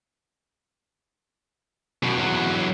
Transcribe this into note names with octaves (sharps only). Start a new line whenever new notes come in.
F#2 B2
E2 F#3